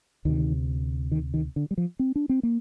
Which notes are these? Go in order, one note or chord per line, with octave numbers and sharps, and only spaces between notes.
D2 C3 D#3
D#3
D#3
D3
G3
F3
C4
D4
C4
A#3